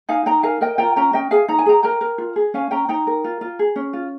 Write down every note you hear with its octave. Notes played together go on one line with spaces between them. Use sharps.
D#4 F5 G#5
D#4 G5 A#5
A#4 F5 G#5
A#4 D#5 G5
F4 G5 A#5
C#4 G5 A#5
C#4 D#5 G5
G#4 F5 G#5
D#4 A#5
G#5
G#4 G5 A#5
A#4 G5 A#5
A#4
F4
G#4
C#4 F5 G#5
C#4 G5 A#5
D#4 G5 A#5
A#4
F4
F4
G#4
C#4
F4